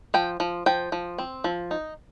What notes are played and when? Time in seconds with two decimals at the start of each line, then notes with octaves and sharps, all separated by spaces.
0.14 F3 G5
0.40 F3
0.66 F3 G5
0.92 F3
1.18 C4
1.44 F3
1.71 D#4